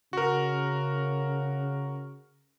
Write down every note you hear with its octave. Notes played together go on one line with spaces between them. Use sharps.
C#3 F#4 A#4